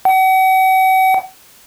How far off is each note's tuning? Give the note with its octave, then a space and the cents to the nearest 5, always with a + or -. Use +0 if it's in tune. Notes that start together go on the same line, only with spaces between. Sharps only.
F#5 +40